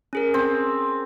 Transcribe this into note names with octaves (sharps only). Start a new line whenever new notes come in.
C#4 G#4 A#4
C4